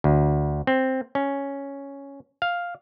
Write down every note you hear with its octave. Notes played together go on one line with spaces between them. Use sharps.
D2
C4
C#4
F5